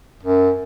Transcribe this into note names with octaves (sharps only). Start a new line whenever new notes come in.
F#2